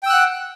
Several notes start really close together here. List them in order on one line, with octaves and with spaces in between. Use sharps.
G5 E6 F#6 F#5